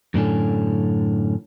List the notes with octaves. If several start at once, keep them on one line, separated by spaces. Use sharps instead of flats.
F#2 A2 D3 C#4